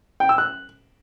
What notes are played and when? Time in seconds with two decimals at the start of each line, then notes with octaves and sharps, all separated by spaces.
0.20 G5
0.29 E6
0.38 F#6